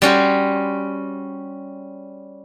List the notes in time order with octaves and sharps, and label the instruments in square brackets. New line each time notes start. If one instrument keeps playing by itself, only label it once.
[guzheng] G3 C#4 F#4 C5